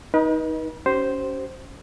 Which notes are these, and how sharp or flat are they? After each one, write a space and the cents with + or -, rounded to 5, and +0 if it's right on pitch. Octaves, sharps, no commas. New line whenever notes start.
D#4 +20 B4 -40 D#5 +0
C#4 +20 G4 -40 C5 +0